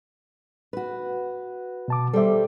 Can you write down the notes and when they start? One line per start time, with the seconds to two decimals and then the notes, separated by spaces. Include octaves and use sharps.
0.73 F#4 B4
1.88 B2 A5 D6
2.13 G3 A4 C5 E5